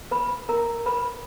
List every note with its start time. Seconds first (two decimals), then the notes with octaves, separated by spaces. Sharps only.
0.11 B4 B5
0.49 A#4 A#5
0.86 B4 B5